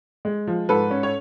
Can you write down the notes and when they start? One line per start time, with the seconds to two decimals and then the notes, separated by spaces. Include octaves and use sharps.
0.25 G#3
0.47 F3
0.69 G#2 A4 B4
0.91 C#4
1.03 C#5